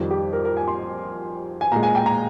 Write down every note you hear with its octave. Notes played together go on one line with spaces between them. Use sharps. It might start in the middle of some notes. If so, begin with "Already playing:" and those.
Already playing: F2 D#3 G3
G4
A#4
A#4
G#5
C6
G#5
A#2 G#3 A#5
G#5
G5
A#5